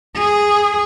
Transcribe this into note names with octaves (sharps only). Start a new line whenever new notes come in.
G#4